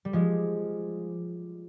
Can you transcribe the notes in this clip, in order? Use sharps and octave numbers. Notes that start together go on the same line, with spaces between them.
G3
F3 G#3